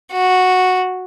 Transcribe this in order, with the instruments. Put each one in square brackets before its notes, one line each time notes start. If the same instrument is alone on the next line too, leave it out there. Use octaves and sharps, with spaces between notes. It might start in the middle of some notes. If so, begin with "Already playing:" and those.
[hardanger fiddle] F#4